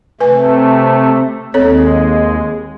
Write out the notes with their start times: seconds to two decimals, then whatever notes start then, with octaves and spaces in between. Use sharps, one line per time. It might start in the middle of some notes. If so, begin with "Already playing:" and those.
0.20 C3 A3 B4 G#5
1.54 D#2 G#3 C4 A4 C#5